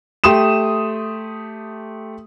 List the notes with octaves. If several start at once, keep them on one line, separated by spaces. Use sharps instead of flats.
A3 G4 C6 D#6 E7